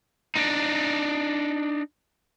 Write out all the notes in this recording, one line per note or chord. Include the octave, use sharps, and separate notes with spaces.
D4 D#4